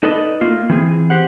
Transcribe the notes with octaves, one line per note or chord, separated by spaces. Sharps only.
D#4 A4 B4 D5 D#5
A3 A#3 F4
E3 C4 G#4
G4 C5 F#5